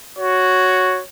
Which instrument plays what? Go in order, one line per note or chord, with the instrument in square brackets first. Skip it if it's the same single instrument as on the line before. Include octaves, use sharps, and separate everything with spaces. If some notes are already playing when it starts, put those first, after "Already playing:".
[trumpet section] F#4 C#5